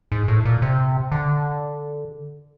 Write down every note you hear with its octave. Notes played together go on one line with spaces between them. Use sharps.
G#2
A2
A#2
C3
D3